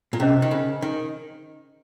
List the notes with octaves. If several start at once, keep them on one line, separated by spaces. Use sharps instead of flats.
A#2
C3 C#4 G#4 C5 D#5
D#3
C#3
D#3